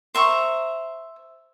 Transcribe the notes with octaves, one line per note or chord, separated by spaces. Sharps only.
C5 E5 A#5 C#6